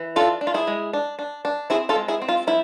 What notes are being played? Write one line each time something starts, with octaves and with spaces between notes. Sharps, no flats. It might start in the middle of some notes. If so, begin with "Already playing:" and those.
Already playing: E3
D4 F4 A4
D4
F4
E4 G#4
G#3
D4
D4
D4
C4 E4 G#4
F4 A4
G#3
E4 G#4
C4
F4
F3 E4